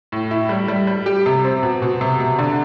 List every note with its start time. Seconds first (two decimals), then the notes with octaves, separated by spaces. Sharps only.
0.12 A2
0.31 E4
0.49 G3
0.68 G3
0.87 G3
1.06 G4
1.26 C3
1.44 C4
1.63 B2
1.82 B2
2.01 C3
2.20 C3
2.39 D3